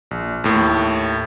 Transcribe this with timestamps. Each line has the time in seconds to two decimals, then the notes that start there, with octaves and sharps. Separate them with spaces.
0.11 A#1
0.44 D#2 A2